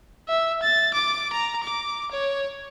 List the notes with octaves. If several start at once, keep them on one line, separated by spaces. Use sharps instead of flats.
E5
A6
D6
A#5
D6
C#5